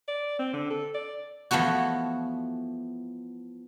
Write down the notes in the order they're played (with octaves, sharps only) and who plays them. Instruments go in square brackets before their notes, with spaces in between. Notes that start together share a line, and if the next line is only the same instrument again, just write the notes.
[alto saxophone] D5
C4
D3
A4
D5
[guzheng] E3 F3 A3 B3 F#4